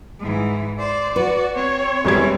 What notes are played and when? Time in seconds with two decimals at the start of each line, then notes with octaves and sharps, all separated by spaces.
0.20 G#2 E3
0.79 C5 D5
1.16 F#4 B4
1.55 C4 C#5
2.05 E1 E3 G3 C4 D5 G#6